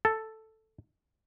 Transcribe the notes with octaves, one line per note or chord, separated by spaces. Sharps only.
A4